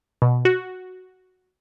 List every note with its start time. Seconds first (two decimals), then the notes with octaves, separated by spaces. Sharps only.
0.22 B2
0.45 F#4